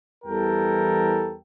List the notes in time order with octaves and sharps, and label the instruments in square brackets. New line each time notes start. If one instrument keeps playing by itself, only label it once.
[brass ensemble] E2 E3 G3 A4 A#4 G5